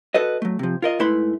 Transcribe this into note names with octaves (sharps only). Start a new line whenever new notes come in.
F#4 A4 B4 D#5
F#3 A3
C3 F3
F4 A#4 D#5
G#2 A3 E4 B4 B5 C6